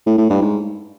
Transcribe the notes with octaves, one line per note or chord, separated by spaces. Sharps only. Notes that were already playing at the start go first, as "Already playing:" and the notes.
A2
A2
G2
G#2